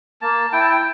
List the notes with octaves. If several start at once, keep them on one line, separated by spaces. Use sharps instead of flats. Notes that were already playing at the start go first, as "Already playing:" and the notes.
A#3 A5
E4 G5
A5
G5